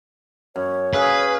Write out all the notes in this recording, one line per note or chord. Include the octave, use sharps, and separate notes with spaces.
F#2 C#5
C#4 G#4 B4 E5 F5